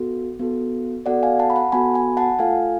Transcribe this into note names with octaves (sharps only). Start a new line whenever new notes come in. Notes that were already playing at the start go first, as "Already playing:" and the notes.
Already playing: B3 F#4 A4
B3 F#4 A4
B3 F#4 A4 D5 F#5
F5 G#5
F#5 A5
B5
F#5 A5
B3 F#4 A4 G#5 B5
G#5 B5
F#5 A5
A3 F4 A4 F5 G#5